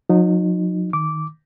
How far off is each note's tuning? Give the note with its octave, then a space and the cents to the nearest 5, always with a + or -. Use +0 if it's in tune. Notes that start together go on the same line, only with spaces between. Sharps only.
F#3 -45 D#4 -15
D#3 +0 D6 -10